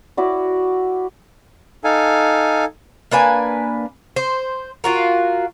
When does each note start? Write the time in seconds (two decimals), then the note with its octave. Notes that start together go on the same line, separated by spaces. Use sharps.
0.17 E4 F#4 D5
1.84 D#4 A4 F5 G#5
3.11 A#3 D4 B4 G#5
4.16 C5
4.84 F4 F#4 A#4